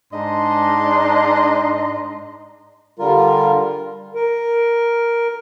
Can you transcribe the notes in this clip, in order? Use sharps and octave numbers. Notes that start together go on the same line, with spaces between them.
G#2 D4 D#5 A#5 C6
D3 G3 F4 A#4
A#4